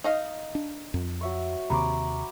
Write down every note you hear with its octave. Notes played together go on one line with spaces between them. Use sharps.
D#4 D#5 F5
D4
F2
F#3 E5 C#6
D#2 C3 D#3 A#5 B5 C#6 D6